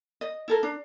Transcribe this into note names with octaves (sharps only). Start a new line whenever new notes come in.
D#5
E4 A4 A#4
D4